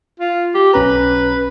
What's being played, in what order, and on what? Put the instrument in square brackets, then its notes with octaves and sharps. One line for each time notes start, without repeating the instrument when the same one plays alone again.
[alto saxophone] F4
G4
[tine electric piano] B1 C#4 A#5 [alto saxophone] B4